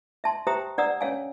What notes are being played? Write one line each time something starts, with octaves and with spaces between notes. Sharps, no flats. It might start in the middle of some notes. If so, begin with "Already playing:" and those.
E5 A5 C6
G4 C5 E5 G5 A#5 D#6
D4 D5 F#5 A#5 D#6 E6
C#4 C#5 F5 G#5